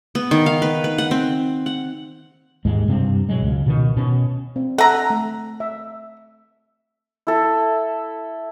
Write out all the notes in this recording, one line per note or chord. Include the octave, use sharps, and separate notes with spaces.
B3
D#3
F5
B4
B4
F#5
C4
F#5
D#2 G#2 G#3
G2 C3 C4
B2 F#3 G#3
C#2
B2 D#3
B2 C#4
C4
A4 E5 F#5 A#5
A3
E5
E4 A4